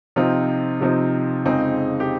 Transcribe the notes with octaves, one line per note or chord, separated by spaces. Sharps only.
C3 F3 C4 D#4 F4
C3 F3 C4 D#4
F2 C#3 G#3 C4 D#4
G4